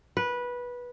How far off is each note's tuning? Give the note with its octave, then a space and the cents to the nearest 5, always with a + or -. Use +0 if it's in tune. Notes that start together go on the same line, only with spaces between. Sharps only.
B4 -15